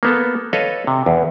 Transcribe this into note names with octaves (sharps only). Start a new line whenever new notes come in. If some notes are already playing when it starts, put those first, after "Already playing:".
A#3 B3 A4
A4 B4 C#5 D#5 F5
C3
E2